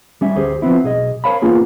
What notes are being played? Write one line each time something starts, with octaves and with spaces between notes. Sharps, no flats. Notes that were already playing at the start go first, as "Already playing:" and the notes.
G3 C#4 E5
D2 G4 G#4 C5
F3 B3 C4 E4
B1 G#4 D#5
A#4 C5 C#5 F5 A5 B5
A#3 B3 C#4 F4 G#4